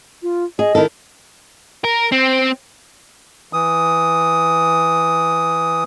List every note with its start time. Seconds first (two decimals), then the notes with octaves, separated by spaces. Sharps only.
0.22 F4
0.59 G#4 D#5
0.75 D#3 E4 A4
1.84 A#4
2.12 C4
3.53 E3 D#6